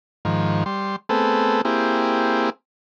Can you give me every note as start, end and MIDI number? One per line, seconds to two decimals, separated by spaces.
0.25 0.64 44
0.25 0.64 51
0.25 0.64 53
0.66 0.96 55
0.66 0.96 84
1.09 1.61 57
1.09 1.61 59
1.09 1.61 60
1.09 1.61 68
1.09 1.61 69
1.65 2.50 58
1.65 2.50 60
1.65 2.50 64
1.65 2.50 67
1.65 2.50 68